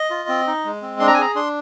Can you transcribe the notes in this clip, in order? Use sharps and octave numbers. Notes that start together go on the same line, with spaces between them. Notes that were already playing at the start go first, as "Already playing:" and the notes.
Already playing: D#5
F4
C4
D#4
G#3
C4
D4 C6
A#5
G#5
G#4 A#5
D4 C6